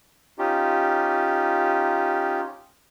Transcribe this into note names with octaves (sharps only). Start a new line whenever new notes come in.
C#4 D#4 F4 G4